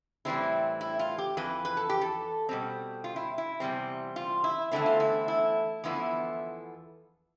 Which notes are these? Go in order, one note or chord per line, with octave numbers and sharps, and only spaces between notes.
A2 E3 G3 C4 E4
E4
F4
G4
F2 E3 B4
B4
A4
G4
A4
B2 G3 C4
F4
E4
E4
E2 C3 G3 C4
F4
E4
E2 D3 A3 C4 E4
F4
E4
E4
E2 D3 F3 B3 E4